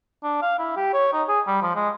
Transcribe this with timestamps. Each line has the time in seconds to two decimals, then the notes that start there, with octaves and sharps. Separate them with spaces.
0.23 D4
0.42 F5
0.58 E4
0.76 G4
0.93 C#5
1.13 D#4
1.28 G#4
1.47 G3
1.62 F3
1.75 G#3